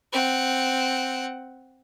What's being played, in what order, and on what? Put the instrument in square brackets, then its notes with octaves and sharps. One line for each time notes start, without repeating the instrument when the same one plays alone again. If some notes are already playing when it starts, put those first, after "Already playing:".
[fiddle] C4 F#5